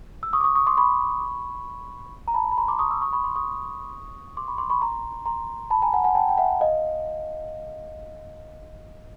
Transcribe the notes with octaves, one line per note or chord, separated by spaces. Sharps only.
E6
C#6 D#6
D6
C#6 D#6
C#6 D#6
C6 D6
B5 C#6
A#5
A5 B5
B5
A#5 C6
C6 D6
C#6 D#6
D6 E6
C#6 D#6
B5 C#6
C6 D6
C#6 D#6
C6 D6
B5 C#6
C6 D6
B5 C#6
A#5 C6
A#5 C6
A5 B5
G#5 A#5
F#5 G#5
F#5 G#5
G5 A5
G5
E5 F#5
D#5 F5